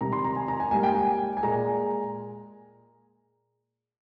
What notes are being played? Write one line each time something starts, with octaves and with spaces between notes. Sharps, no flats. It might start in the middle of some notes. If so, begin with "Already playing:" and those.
C3 D#3 G3 A#5
C6
A#5
G#5
A#5
G#5
G#2 G3 A#3 G#5
G5
G#5
G#5
A#2 G#3 A#5